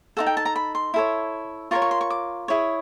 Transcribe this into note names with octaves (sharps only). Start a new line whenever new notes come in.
D#4 F#4 A4 F#5
G5
A5
A#5
B5
C6
E4 A4 C#5
F4 A#4 C#5 C#6
C#6
C6
C#6
D6
E4 G#4 C#5